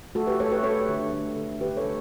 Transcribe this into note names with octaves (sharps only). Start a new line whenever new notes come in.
A3 F#4 A4
G4 B4
A3 A4 C#5
G4 B4
A3 A4 C#5
D3
A3
D3
D3 G4 B4
A4 C#5
A3